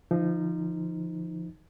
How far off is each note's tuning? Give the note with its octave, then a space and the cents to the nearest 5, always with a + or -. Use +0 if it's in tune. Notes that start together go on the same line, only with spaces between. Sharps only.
D3 +0 F3 -25 D#4 +0